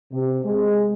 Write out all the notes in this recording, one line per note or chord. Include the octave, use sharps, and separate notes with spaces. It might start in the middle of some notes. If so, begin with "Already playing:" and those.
C3
G#3